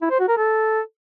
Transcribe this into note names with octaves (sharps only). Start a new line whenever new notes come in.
E4
C5
F#4
A#4
A4